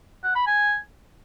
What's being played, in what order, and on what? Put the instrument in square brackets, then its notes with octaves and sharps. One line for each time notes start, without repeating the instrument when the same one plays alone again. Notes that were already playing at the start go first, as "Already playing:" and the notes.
[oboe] F#5
B5
G#5